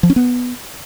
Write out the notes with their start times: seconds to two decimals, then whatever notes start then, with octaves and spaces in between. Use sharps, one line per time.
0.03 F3
0.10 C#4
0.16 B3